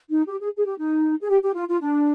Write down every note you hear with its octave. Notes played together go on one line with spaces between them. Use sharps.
D#4
G4
G#4
G#4
G4
D#4
G#4
G4
G4
F4
F4
D4